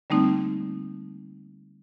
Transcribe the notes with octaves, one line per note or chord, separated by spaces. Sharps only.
D3 G3 A3 A#3 C4 D#4